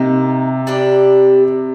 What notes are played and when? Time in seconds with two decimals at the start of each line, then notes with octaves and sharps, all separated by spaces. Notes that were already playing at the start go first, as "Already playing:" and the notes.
Already playing: C3 D#3 A#3 D#4
0.67 G3 D4 G4